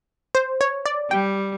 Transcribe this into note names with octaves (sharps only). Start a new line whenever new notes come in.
C5
C#5
D5
G3 G5